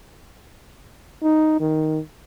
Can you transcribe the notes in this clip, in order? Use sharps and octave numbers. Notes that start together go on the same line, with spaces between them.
D#4
D#3